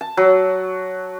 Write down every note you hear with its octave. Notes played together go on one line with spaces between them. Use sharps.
A5
F#3